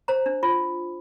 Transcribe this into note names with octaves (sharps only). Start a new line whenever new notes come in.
C5 A#5
D4
F4